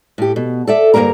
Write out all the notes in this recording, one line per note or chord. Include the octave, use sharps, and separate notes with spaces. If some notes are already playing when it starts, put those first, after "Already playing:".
A2 G4
B2
A4 D5 E5
D2 G2 D#3 A#3 A#4 A#5